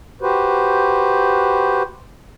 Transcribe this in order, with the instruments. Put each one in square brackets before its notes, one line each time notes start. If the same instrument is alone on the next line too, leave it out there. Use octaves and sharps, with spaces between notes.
[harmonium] F#4 G4 B4 C5